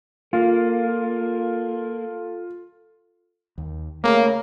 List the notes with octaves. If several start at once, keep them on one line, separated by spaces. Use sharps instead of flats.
A#3 F4 A4
D#2
C#3 A3 A#3